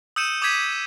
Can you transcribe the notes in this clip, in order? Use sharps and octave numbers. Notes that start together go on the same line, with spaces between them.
D#6 E6 G6 C#7 D#7 E7
D6 D#6 G6 G#6 B6 D#7